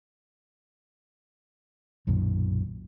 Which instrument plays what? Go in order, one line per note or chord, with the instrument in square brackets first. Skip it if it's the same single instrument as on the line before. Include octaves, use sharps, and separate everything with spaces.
[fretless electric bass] B1 F#2 A#2 D#3